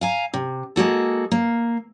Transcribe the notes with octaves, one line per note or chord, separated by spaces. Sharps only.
F5 G#5 A#5
C3
G#3 A#3 F#4 A4
A#3